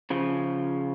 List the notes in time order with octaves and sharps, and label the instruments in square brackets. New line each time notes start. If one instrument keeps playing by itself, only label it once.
[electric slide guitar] C#3 F3